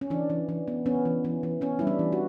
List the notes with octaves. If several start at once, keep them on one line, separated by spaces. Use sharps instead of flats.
C#4
E3 D4
E3
E3
B3
B3 C#4
E3
E3
E3
B3 C#4
G3 E4
D4
E3
F#4